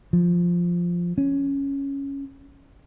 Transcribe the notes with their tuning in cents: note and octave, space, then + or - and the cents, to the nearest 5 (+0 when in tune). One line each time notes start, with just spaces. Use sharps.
F3 +0
C#4 +0